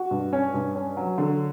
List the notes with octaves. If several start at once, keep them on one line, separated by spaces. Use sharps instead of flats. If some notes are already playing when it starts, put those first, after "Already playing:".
Already playing: F#4
G2
C#4
G2
C#4
F#3
D3